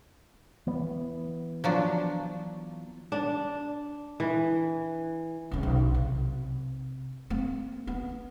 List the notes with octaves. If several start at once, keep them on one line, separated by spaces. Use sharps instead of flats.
E3 B3
F3 F#3 D4
D4
E3
C2 C#3
B1
C3
A#3 C4
B3